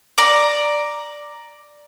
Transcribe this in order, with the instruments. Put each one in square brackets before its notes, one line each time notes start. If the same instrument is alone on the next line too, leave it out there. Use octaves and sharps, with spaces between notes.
[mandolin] D5 A#5